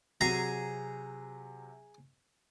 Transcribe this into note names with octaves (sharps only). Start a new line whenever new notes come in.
C3 F#3 F#4 G#4 A#5